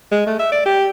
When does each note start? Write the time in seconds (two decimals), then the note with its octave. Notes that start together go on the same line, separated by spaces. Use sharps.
0.11 G#3
0.26 A3
0.39 E5
0.52 D5
0.65 G4